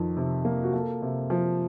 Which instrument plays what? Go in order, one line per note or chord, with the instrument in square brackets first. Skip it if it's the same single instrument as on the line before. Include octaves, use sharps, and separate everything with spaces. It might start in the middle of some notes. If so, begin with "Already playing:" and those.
Already playing: [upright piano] F2 D#3
C3
A#3
F#4
A#3 A4
C3
F3